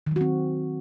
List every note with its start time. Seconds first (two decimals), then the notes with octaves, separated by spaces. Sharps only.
0.07 D#3
0.11 F#3
0.16 F#4
0.21 C4